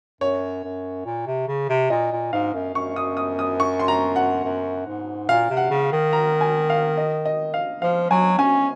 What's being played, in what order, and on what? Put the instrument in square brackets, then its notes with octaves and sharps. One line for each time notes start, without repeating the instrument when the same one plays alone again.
[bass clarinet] F#2 [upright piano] C#5
[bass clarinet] F#2
A#2
C3
C#3
C3
[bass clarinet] A#2 [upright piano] D#5
[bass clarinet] A#2
[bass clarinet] G#2 [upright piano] F5
[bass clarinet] F#2
[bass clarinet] F#2 [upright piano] C#6
[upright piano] D#6
D#6
D#6
C#6
C6
A#5
F#5
[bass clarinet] F#2
G#2
[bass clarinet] A#2 [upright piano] F5
[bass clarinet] C3
[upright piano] F#5
[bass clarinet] C#3
D#3
[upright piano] A#5
G#5
F5
D#5
D#5
F5
[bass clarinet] F3 [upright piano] F5
[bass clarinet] F#3 [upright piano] G#5
[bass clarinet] C#4 [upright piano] G#5